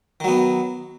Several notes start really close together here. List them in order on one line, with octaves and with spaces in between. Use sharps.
D#3 F#3 B3